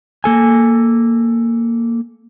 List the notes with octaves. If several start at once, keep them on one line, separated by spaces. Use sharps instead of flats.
A#3 A4 G#5